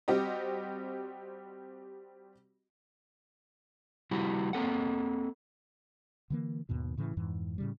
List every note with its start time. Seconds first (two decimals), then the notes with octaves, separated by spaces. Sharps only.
0.08 G3 C4 F#4 G4 D#5
4.11 G3 E4 F#4 G4
4.53 A#3 C4 A4 F#5
6.30 D3 E3 A#3
6.69 D#2 G#2 B2 D#3
6.97 A2 C#3 E3
7.17 F2 G#2 E3
7.58 A2 C#3 G3